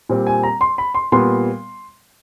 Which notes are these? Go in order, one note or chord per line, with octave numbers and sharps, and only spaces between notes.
A#2 G3 C4
G#5
A#5
C6
B5
C6
A#2 G3 B3 C6